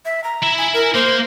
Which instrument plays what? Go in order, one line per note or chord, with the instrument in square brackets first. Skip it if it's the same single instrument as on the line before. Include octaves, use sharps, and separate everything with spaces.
[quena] E5
A#5
[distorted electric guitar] E4 E5
[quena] G#5
A#4
[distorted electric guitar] A#3 [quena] C5